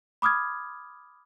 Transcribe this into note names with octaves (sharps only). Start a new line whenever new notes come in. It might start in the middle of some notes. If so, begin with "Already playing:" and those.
B5 D6 D#6 F6 G#6